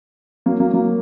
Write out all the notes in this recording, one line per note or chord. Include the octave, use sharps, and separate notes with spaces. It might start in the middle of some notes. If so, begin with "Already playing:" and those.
F#3 A#3
F#3 A#3
F#3 A#3